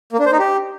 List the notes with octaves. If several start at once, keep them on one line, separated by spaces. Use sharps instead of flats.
A#3
D4
C5
D#4
G4